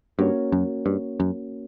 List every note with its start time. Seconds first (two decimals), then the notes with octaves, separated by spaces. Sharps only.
0.19 G2 A#3 C#4 F#4 A#4 C#5
0.52 F#2
0.86 G2
1.20 F#2